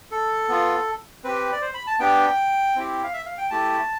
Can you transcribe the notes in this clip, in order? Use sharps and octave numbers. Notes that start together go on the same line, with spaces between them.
A4
B3 F4
C4 G4 B4
D5
C5
B5
A5
B3 D4 G4 G5
C4 E4 G4
F5
E5
F5
G5
A3 E4 G4 A5